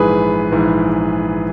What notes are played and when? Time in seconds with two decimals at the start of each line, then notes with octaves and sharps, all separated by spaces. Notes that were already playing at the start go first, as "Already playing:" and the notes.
Already playing: A#1 G#2 E3 G#4 B4
0.52 A#1 G#2 E3